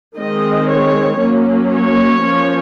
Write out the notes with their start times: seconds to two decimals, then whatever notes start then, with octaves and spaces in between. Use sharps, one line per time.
0.16 D#3 G#3 C4 D#5
0.68 C#5
1.19 F#3 A#3 C#4
1.72 C#5
2.23 F3 A#3 C#4